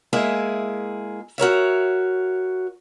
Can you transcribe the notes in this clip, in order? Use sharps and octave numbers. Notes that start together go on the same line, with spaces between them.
G#3 A#3 E4 G#4 E5
F#4 A#4 C#5 E5